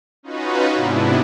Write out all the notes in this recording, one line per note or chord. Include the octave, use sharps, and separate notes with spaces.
C#4 D#4 F4 F#4 B4
G#2 C3 B3 D4 E4